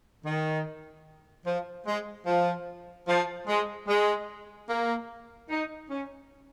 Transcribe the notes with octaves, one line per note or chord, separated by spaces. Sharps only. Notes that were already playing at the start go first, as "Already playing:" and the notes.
D#3
F3
G#3
F3
F3
G#3
G#3
A#3
D#4
C#4